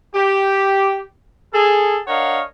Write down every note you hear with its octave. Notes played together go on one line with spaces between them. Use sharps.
G4
G#4 A4
D4 A#4 C#5 D#5 F5 F#5